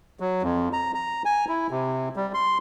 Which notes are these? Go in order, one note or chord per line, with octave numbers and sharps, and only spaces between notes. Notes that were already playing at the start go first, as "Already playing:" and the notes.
F#3
F2
A#5
A#5
G#5
E4
C3
G3
C6